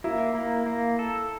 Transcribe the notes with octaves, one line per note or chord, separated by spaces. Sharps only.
A#3 E4
A#3
A#3
A4